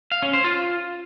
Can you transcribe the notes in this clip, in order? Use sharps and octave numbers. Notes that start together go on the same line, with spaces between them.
F5
C#4
C5
F4